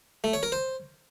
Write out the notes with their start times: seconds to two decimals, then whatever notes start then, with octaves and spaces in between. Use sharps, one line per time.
0.24 A3
0.33 C#5
0.43 A#4
0.52 C5